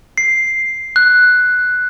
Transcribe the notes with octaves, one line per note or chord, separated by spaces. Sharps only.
C7
F#6